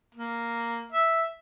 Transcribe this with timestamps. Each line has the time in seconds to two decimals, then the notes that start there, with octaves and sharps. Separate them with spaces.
0.15 A#3
0.92 E5